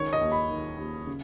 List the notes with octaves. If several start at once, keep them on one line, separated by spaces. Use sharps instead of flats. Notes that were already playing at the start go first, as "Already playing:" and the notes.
Already playing: C#2 D#3 C#5
D#5
D#2
B5
D#3
D#2
C#3